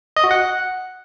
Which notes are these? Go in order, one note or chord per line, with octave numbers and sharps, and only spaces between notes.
D#5
F#4
F#5